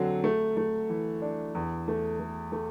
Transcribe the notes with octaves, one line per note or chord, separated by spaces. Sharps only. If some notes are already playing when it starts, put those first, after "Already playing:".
Already playing: D3 F#3 C4
A3
A3
E3
D4
E2
A3
A3
A3